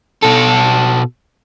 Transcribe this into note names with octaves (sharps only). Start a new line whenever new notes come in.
B2 A4